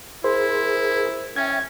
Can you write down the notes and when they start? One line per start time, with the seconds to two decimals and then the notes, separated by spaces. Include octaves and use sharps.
0.24 E4 G#4 A#4 C5
1.36 C#4 E5 G5 G#6 A6